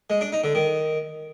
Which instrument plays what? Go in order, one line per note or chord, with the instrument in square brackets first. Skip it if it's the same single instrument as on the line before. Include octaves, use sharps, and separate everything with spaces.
[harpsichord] G#3
D4
D#4
D3
D#3